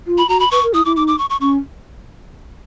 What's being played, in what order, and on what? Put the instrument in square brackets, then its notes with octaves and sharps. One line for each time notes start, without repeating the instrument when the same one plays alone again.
[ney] F4
[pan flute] B5
[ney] F#4 [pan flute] A#5
[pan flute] B5
[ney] B4 [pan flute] C#6
[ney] A#4
[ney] E4 [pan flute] D#6
[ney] E4 [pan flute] D6
[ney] D#4 [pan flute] D6
[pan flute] D6
C#6
C#6
[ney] C#4 [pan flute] C#6